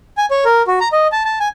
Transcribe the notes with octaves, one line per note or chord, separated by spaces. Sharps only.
G#5
C#5
A#4
F#4
A#5
D#5
A5
A5
G#5